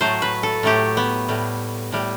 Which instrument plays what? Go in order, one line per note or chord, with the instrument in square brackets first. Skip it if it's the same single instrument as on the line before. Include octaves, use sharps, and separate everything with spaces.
[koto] A2 F#3 A3 C5
B4
A4
A2 F#3 A3 G4
B3
A2 G3
A2 G3